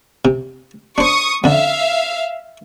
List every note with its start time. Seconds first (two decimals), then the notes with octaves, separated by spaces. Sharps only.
0.25 C3
0.98 D4 C5 C#6 D#6
1.44 F2 D3 E5 F5